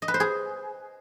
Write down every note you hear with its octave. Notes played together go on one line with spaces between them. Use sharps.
D#5
B4
C5
G#4